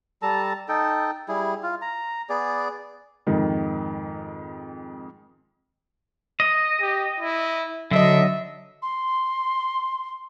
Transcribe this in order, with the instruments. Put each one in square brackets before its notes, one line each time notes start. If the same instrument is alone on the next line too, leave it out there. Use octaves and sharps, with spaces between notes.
[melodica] G3 A4 A5 A#5
D#4 A4 G5
G3 E4 G#4
F4
A#5
B3 G#4 D5
[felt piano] F2 G#2 D#3
[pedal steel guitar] D#5
[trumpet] G4
E4
[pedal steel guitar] D3 [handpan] F#3 D#5 [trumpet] E5
[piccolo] C6